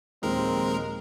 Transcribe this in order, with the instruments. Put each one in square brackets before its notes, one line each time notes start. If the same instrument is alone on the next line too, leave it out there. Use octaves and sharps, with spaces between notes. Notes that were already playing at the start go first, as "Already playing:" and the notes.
[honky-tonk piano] D#2 A#2 F3 [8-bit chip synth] G#3 A#4 [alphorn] C4